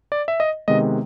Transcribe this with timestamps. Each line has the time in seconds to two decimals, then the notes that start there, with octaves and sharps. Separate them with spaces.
0.12 D5
0.28 E5
0.40 D#5
0.68 C3 D#3 G#3 B3 D#5